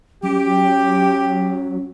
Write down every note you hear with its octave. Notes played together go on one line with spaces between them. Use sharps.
F#3 C#4 G4